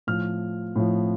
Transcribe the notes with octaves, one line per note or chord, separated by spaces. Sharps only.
A2 F3 F6
A2 F3